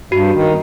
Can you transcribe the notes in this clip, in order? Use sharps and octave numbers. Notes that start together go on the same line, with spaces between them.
G2 F#4
D#3